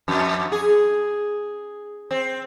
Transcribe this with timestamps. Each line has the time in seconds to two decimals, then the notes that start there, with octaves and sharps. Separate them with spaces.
0.08 F2
0.52 G#4
2.11 C4